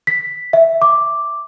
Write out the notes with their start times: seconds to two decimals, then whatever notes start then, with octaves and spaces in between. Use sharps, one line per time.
0.07 B6
0.53 E5
0.82 D6